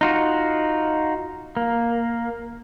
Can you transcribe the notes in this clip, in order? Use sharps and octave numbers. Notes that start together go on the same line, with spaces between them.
D#4 F4 F#4
A#3